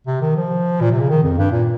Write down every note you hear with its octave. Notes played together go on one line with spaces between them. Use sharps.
C3
D#3
F3
A#2
C3
C#3
D#3
F2
G2
A#2